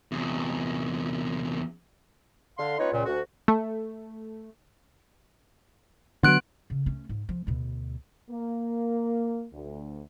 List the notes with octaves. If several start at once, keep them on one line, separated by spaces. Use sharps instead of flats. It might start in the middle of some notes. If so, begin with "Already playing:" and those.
E2 C3
D3 F5 C6
B3 C#4 D#4 F4 B4 C#5
C#2 A#2
D2 F#4
A3
D3 F3 F#3 B3 F#6 D7
C#3
A3 C#4
G#2
F3
D2 B2
A#3
D2